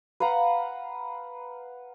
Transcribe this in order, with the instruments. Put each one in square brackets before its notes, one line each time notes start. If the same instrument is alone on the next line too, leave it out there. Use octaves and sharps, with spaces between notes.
[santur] B4 F5 F#5 A#5